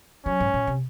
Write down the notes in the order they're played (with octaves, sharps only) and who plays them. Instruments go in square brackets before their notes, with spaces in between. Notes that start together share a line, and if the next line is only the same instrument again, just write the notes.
[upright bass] F#3 [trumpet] C#4
[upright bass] G#2
A#2
C3